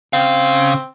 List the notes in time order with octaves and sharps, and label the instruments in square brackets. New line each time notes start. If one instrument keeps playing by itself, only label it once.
[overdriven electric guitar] C#3 F5 [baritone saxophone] C4